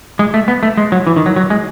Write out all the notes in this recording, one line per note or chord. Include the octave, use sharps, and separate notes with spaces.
G#3
A3
B3
A3
G#3
F#3
E3
D#3
F#3
F#3
G#3